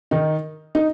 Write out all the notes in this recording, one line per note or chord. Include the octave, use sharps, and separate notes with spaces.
D#3 D#4
D#4